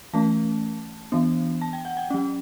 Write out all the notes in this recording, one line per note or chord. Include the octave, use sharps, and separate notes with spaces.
E3 A3 C#4 A5
E3 B3 D4
A5
G5
F#5
G5
F#3 C#4